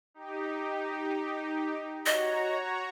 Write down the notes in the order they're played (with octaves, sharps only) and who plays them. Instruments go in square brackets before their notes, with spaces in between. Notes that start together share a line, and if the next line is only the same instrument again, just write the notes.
[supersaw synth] D#4 G4
[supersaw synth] F#4 C#5 A#5 [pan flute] D#5